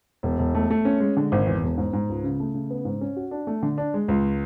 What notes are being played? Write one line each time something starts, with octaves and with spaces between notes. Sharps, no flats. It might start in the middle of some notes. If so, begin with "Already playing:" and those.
E1
E1
A3
A3
C#4
G#3
D3
G#1
E2
E1
G#2
G#2
C#2
C#3
A3
C#3
B3
G#2
C#4
F#4
D4
A3
D3
D4
G#3
C#2